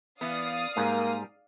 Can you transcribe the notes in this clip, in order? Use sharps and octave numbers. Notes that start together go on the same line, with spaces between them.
E3 B3 D5 F5 D#6
G#2 G3 A#3 A#4